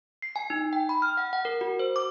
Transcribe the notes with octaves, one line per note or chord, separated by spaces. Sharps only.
C7
G#5
D#4
G5
B5
F6
F#5
F#5
A#4
F#4
C5
D6